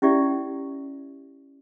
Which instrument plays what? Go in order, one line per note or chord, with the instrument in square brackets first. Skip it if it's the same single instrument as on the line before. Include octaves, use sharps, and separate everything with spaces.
[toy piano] C#4 E4 G4 D5 E5